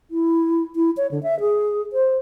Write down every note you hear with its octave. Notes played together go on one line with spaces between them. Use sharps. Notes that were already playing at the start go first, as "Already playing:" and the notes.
E4
E4
C#5
D3
E5
G#4
C5